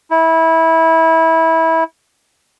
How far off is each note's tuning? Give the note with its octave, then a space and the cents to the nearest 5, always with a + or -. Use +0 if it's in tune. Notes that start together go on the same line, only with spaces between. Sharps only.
E4 -20